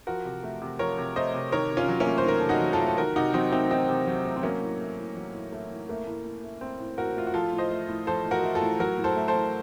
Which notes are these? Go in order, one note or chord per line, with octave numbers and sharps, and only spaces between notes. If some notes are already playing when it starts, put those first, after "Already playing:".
F3 F#4 A#4
C3
A3
C3
F3 A#4 C#5
C3
A3 C5 D#5
C3
D#3 A#4 C#5
C3
C#4 F4
F#3
A#3 C#4
A3
C5
D#3 A#4
C3 A4
D#4 F#4
F#3
F4 A4
A3
A4
D#3 F#4 A#4
C3 D#4 F#4
F#3 C4 D#4
A3 C4 D#4
D#3 C4 D#4
C3
F#3
A3
C4
F#3 A#3 C#4
A2
A3
A2
F#3
A2
A3
A2
A3 A#3
A2
A2
A3
A3 C4
A2
A2 F#4 A#4
A3 F4
F#4
F3 F4 A4
A2
C5 D#5
A3
A2
F3 A4 C5
A2
F#4 A#4
A3
F4 A4
A2
F#3 F#4 A#4
A2
A4 C5
A3
A4 C5
A2